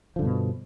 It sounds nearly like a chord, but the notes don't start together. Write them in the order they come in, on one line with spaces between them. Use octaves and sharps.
F3 D3 G2 B2